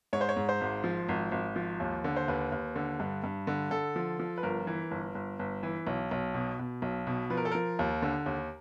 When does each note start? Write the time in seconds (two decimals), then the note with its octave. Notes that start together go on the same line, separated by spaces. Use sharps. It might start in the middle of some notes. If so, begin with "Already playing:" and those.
0.13 G#2 C#5
0.21 C5
0.29 C#5
0.37 G#2
0.49 C5
0.61 G#1
0.84 F3
1.09 G#1
1.32 G#1
1.56 F3
1.80 D#2
2.04 D3
2.16 C5
2.28 D#2 B4
2.52 D#2
2.76 D3
3.00 G2
3.24 G2
3.47 D3
3.71 D3 A4
3.96 F3
4.19 F3
4.38 B4
4.43 G1 A#4
4.67 E3
4.91 G1
5.15 G1
5.39 G1
5.63 E3
5.87 B1
6.11 B1
6.34 B2
6.59 B2
6.82 B1
7.07 B2
7.30 F3 B4
7.37 A#4
7.45 A4
7.51 F3 A#4
7.79 D#2
8.02 D3
8.26 D#2